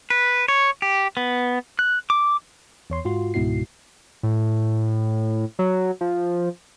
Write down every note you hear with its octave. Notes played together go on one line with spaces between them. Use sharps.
B4
C#5
G4
B3
F#6
D6
E2 C#5 C6
G#2 F4 F#4 C6
C#2 G#2 B2 E4 F#4 C7
A2
F#3
F3